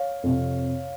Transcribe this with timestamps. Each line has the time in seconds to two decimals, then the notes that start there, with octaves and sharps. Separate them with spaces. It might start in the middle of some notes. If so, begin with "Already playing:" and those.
Already playing: C#5 F5
0.23 F2 C3